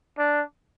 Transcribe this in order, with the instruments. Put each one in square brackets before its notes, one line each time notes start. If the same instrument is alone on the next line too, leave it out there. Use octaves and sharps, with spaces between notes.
[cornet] D4